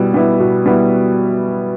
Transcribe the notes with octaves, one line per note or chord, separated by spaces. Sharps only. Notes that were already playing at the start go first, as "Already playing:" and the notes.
Already playing: B2 G3 B3 E4
G3 B3 E4
B2
G3 B3 E4